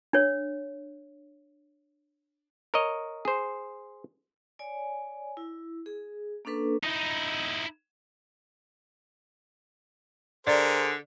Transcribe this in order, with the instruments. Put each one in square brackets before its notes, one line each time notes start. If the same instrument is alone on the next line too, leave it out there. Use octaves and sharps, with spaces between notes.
[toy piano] D4 C#5
[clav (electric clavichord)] A#4 C#5 D#5
G#4 C5
[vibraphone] C#5 D5 G#5
E4
G#4
A#3 C#4 D4 A4 B4
[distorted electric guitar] D#4 E4
[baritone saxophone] D3 [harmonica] G#4 A#4 C5 [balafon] D5